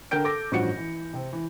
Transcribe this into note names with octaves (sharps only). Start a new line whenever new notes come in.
D3 A#4 G5 G6 D7
A4 D6 A#6
A1 G2 F3 F#4 F#5 C#7
E3
C3 C4
E3